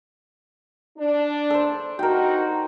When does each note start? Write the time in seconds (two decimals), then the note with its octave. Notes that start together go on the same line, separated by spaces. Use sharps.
0.97 D4
1.50 A4 C5
1.99 D#4 F#4 A#4 G5